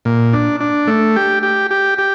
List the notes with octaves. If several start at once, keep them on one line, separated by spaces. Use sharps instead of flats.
A#2
D4
D4
A3
G4
G4
G4
G4